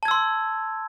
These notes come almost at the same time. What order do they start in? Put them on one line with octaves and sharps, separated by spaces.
A5 G#6 E6 C6